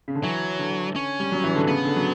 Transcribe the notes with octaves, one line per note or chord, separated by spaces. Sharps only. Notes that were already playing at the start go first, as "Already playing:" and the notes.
C#3
D3
E3 F#3
D3
C#4
G3
F#3
E3
D3
C#3 B3
D3
F#3